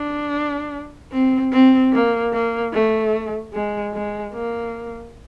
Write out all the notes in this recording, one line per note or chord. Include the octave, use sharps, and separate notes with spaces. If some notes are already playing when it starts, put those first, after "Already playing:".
Already playing: D4
C4
C4
A#3
A#3
A3
G#3
G#3
A#3